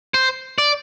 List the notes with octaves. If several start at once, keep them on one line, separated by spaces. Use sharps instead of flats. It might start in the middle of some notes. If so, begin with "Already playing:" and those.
C5
D5